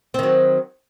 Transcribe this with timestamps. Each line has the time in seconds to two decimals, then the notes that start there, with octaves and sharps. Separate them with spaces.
0.14 C4
0.19 D#3
0.23 F#3